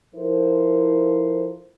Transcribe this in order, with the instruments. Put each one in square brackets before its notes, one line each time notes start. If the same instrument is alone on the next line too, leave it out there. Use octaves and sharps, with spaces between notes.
[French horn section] F3 E4 A4 A#4 C5